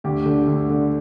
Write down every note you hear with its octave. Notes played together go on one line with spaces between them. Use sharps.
D2 G4
D3
D2
D3